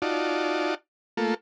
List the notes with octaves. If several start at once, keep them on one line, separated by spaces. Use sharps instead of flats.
D#4 F4 F#4 D5 A5
A3 A#3 F4 A4